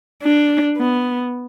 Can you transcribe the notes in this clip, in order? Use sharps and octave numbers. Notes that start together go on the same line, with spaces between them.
D4
B3